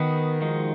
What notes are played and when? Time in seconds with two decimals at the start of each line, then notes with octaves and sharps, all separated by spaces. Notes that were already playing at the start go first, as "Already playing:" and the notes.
Already playing: D#3 B3 F#4 B4 D#5
0.41 F3 G#3 D#4 F#4